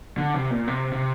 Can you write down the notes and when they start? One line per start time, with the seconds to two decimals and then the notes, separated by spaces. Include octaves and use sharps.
0.18 D3
0.34 C3
0.51 A#2
0.68 C3
0.92 C3